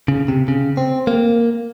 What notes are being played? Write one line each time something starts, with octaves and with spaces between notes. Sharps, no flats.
C#3
C3
C#3
C4
A#3